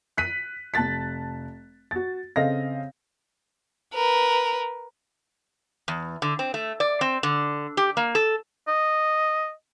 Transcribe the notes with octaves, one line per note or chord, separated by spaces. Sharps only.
F#6 B6 D#7
F1 A5 F#6 A6 B6
F#4 A6
C#3 C4 A4 D#5 F5 A#6
A#4 B4
E2
D3
C4
A3
D5
C4
D3
G4
A#3
A4
D#5